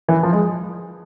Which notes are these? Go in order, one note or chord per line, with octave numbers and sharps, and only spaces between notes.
E3
F3
G#3